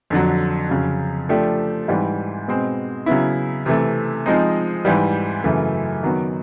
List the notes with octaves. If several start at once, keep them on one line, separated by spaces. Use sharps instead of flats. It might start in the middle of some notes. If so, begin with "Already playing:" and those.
F2 D3 F#3
F2 C#3 F#3
F3 A3 D4 G4
G#2 E3 G3
B2 G#3 C4
C#3 F#3 B3 E4
C3 E3 A3
F3 G#3 C4 D#4
G#2 E3 G3
F#2 C#3 E3 A3
D#3 F#3 B3